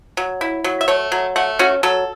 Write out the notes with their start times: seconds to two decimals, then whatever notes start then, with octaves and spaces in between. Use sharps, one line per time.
0.17 F#3
0.41 E4
0.64 F#3
0.81 E5
0.88 A3 C#5
1.12 F#3
1.36 A3 F#5
1.59 C#4 F#4
1.83 F#3 A4